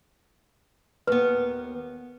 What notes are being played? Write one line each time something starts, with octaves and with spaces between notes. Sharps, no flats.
D#2 B3 B4